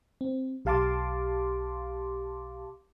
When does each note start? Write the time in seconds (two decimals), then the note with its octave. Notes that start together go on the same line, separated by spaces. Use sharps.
0.21 C4
0.65 B1 G4 F5 A5 C6 D6